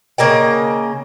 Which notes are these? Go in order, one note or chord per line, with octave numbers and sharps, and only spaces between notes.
C#3 A#3 D#5 G5